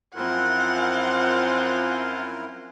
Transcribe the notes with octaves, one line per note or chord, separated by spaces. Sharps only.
F#2 F3 C4 E4 F4 A#4 F#5 G#5